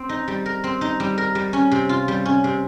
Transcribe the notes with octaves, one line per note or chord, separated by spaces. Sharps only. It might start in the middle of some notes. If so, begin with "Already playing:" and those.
Already playing: C4
D#4
G3
A#4
C4
D#4
G3
A#4
G3
C#4
C3
F4
G3
C#4
C3